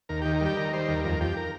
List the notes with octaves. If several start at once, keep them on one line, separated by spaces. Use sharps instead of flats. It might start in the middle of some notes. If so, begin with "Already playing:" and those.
D#2 A#4
D#3 G4
A#4
G3 G4
D#3 A#4
G3 C5
D#2 A#4
F2 A#4
F2 G4
A#4